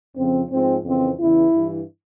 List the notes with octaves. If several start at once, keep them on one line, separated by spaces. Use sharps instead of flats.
F2 C#3 F3 C4
G#2 F3 C4
F2 C#3 E3 C4
E2 C#3 E3 E4
G2 E3